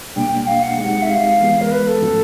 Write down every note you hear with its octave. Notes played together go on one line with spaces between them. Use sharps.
B2 G3 A#3 D4 G5
G5
F5
F#5
G#3 C4 D#4 G4 F#5
E5
F5
E3 G#3 B3
A#4
B4
A4
A2 F3 A3 C#4 F#4